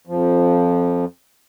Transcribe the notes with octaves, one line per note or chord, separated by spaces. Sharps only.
F2 F3